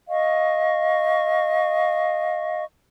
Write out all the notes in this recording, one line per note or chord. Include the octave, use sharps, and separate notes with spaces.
D#5 F5 C#6